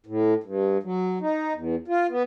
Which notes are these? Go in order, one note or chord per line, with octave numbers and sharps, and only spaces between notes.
A2
G2
F#3
D#4
E2
F4
B3